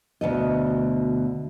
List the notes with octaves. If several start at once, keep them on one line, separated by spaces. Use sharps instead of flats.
D2 B2 D#5